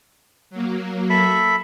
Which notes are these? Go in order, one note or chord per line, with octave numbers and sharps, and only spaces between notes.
F#3 A#3
A4 E5 B5